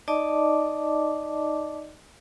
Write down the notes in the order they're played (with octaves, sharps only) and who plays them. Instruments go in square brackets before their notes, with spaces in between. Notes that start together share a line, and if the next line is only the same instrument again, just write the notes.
[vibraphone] D#4 D5 D#5 A5 D6